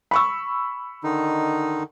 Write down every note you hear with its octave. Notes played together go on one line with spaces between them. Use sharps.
B5 C#6 E6
D3 D#3 D#4